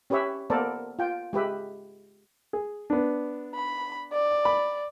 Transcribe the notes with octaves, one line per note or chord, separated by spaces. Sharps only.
C#4 G4 B4 C#5 E5
A#3 B3 A4 A#4 C5 D5
F4 G5
G#3 G4 B4 E5
G#4
B3 D4
B5
D5
B5